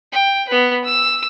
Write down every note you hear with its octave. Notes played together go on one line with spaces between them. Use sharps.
G5
B3 B4
E6